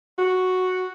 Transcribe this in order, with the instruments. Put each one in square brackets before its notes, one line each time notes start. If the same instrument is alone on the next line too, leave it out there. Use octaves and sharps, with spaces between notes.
[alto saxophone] F#4